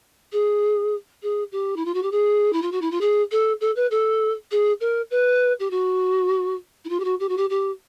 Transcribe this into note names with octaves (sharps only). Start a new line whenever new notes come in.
G#4
G#4
G4
E4
F4
F#4
G4
G#4
E4
F4
F#4
E4
F4
G#4
A4
A4
B4
A4
G#4
A#4
B4
G4
F#4
E4
F4
G4
F#4
G4
F#4
G4
G4